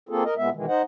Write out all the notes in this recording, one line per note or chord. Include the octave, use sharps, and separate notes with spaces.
A#3 C4 F4 G#4 A4
A#4 D#5
A#2 G#3 B3 E5
B2 D#3 E3 G#3
D#4 C5 D#5 F#5